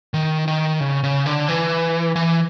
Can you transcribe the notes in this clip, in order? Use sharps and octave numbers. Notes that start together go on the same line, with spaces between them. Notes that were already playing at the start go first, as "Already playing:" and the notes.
D#3
D#3
C#3
C#3
D3
E3
E3